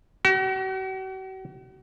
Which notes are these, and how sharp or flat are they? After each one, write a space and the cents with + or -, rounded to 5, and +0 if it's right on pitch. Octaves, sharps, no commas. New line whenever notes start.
F#4 +45